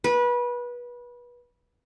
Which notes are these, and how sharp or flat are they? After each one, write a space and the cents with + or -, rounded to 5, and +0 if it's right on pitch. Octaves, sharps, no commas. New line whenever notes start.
B4 -25